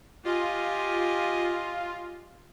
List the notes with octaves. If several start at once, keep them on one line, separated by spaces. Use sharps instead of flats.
F4 G4 D#5 G#5